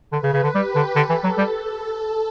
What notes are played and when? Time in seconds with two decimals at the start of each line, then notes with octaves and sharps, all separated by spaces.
0.12 D3 B4
0.23 C#3
0.33 C#3
0.43 D3
0.54 G3 G4
0.75 D3
0.96 D3 A4
1.09 E3
1.24 F#3
1.38 G3